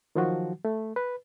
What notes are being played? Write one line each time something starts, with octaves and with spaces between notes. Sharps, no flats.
D#3 F3 F#3 F#4
A3
B4